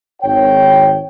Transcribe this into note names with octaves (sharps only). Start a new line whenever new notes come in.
G#1 C#5 G5